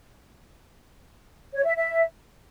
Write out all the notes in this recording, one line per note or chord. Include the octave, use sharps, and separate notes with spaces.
C#5
E5
E5